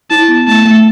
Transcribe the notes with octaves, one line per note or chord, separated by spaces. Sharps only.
E4 A5
B3
A3 A5
A3